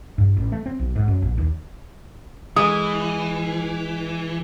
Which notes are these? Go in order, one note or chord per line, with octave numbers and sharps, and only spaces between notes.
G2
A1
A3
C4
B1
G#2
F#2
A#1
D#2
E3 G#3 D#6